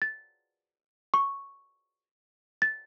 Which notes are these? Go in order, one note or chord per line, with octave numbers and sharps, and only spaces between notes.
A6
C#6
A6